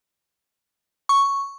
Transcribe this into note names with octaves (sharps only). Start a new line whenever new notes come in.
C#6